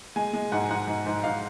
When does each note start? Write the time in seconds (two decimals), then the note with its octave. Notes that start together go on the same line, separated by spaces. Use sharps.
0.16 G#3 G#5
0.33 G#3
0.52 G#2 F#5
0.60 G#5
0.69 G#2 F#5
0.87 G#2
1.06 G#2
1.24 G#2 F5